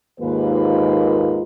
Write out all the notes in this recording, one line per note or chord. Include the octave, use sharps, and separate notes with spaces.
D#2 G#2 A#3 F4 A#4 B4